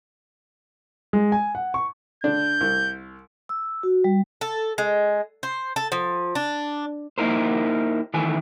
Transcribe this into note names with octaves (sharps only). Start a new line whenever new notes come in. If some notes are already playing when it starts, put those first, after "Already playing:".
G#3
G#5
F#5
C#6
D3 D4 G6
C2
E6
F#4
G3
A4
G#3
C5
A4
F3
D4
A#3 D#4 E4 A#4 C5
D#3 E3 A3 G#5